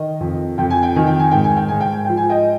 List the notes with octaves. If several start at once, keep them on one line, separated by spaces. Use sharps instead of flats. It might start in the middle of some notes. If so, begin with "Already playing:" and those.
Already playing: D#3 D#5
F2
F2 G5
G#5
G5
D#3 G#5
G5
G#5
G#2 G5
G#5
G5
G#2 G#5
G5
G#5
F3 G5
G#5
D#5 G5